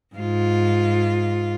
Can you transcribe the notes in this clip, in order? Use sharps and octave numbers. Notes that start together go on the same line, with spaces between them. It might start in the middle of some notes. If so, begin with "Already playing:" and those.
G#2 F4